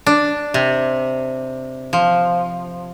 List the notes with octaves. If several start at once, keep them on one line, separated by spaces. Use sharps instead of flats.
D4
C3
F3